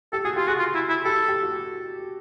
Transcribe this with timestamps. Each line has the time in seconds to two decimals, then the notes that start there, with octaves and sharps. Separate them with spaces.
0.13 G4 A4
0.24 F#4 G#4
0.36 F4 G4
0.48 F#4 G#4
0.59 F4
0.75 E4
0.90 E4
1.05 G4 A4
1.28 G4
1.43 F#4